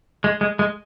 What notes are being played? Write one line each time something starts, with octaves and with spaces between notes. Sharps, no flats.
G#3
G#3
G#3